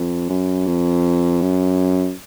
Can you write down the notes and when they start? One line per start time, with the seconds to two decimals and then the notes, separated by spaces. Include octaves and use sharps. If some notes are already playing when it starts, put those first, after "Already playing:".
Already playing: F2
0.30 F#2
0.67 F2
1.42 F#2